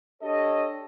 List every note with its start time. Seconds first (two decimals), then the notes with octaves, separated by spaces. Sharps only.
0.22 D4 G4 A4 C#5 D#5